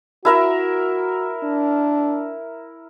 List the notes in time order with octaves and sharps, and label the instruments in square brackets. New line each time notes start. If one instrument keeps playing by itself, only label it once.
[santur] E4 A#4 E5 [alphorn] F#4
[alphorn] D4